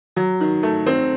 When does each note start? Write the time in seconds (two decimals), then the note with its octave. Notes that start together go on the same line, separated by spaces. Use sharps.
0.16 F#3
0.41 D#3
0.63 A3
0.87 C4